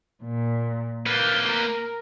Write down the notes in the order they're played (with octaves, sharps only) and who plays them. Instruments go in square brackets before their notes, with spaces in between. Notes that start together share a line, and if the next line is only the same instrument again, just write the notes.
[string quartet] A#2
[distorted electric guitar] A#3 B4 [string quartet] F6 G6 A6
[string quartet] A#4